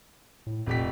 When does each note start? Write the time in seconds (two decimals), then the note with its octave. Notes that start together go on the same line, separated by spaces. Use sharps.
0.47 A2
0.66 F1 A#2 G4 B6